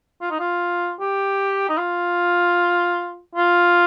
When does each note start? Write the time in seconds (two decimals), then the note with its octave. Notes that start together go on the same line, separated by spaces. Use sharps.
0.22 F4
0.31 D#4
0.39 F4
1.00 G4
1.69 D#4
1.78 F4
3.35 F4